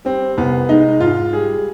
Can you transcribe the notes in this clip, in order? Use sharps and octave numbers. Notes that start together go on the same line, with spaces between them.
G3 C4
C2 B3
G#3 D#4
G#2 F4
G3 G#4